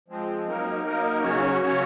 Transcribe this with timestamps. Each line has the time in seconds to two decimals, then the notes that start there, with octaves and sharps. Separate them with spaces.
0.08 F3 G#3 C4
0.46 F#3 A#3 D#4 A#4
0.84 F#3 A#3 D#4 A#4
1.22 C#3 F#3 C#4 F#4 C#5
1.61 C#3 F#3 C#4 F#4 C#5